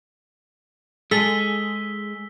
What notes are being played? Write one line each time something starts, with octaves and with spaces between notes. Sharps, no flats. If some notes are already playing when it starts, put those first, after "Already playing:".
G#3 G#4 A4 E6 B6 G7